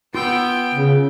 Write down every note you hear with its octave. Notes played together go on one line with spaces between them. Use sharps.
B3 F4 G5 C6 E6
C#3